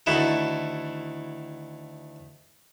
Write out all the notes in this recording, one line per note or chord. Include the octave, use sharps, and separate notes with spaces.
D2 D#3 E4 F#4 A4